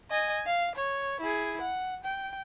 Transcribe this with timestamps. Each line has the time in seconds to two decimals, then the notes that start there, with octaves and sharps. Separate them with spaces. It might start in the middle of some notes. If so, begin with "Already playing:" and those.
0.10 D#5 G#5
0.46 F5
0.75 C#5
1.20 E4 G#4
1.61 F#5
2.04 G5